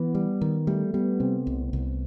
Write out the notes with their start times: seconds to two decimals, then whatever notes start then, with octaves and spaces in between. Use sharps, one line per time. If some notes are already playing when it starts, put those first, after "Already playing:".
Already playing: E3 B3
0.15 G3
0.41 D#3
0.67 G3 A3
0.94 G3 B3
1.20 C3 C4
1.47 C2
1.73 C2